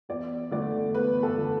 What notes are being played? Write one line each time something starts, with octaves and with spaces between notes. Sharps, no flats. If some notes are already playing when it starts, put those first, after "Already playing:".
E2 D5
D3 A3 D5
E2 B4
A4
D3 A3